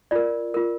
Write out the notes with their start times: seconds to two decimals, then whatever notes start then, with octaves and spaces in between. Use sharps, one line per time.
0.11 F4 A#4 D5
0.54 F4 A#4